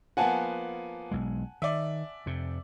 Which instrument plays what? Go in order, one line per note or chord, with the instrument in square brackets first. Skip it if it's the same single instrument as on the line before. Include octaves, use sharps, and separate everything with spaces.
[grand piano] F3 A#3 B3 [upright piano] F#5 G#5 A5
[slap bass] B1 G#3
[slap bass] D#3 [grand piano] D5 E5
[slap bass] F2 C3